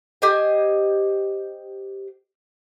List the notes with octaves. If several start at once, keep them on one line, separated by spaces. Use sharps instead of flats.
G4 C5 D#5 G#5